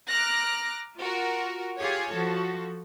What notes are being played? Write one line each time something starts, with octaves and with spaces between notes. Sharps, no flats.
A#5 D6 F6 F#6 A#6
F4 F#4 A#4
F4 G4 G#4 C#5
F3 F#4 A4